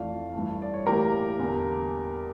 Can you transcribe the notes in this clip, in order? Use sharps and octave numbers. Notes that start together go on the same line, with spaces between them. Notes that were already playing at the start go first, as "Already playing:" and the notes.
Already playing: F2 E3 A3 D5 F5
G2 E3 A3
D5
C#5
A2 E3 A#3 G4 A#4
E2 D3 G3 A#3